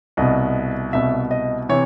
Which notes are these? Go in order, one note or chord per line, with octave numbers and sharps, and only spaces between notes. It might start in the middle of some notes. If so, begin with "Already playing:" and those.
C2 B2 D#5
C2 B2 E5
D#5
C3 E3 C#5